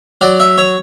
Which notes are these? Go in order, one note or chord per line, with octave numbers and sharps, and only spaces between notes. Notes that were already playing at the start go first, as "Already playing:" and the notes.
F#3 D5
E5
C#5